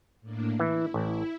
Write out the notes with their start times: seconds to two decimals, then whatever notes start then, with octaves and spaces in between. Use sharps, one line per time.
0.21 A2 A#3 D4
0.60 E3 E4
0.94 A1 E4